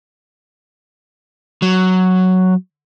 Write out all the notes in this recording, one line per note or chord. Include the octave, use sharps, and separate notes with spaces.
F#3